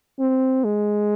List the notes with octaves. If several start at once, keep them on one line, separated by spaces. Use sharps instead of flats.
C4
G#3